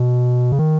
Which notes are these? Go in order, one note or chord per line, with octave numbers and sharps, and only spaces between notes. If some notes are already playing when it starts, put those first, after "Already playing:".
Already playing: B2
C#3
D#3